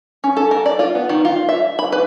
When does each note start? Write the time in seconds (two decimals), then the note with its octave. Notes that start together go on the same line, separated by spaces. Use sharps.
0.24 C#4
0.37 A4
0.51 A#4
0.66 D5
0.79 F4
0.95 B3
1.09 D#3
1.25 F4
1.49 E5
1.79 B5
1.92 B4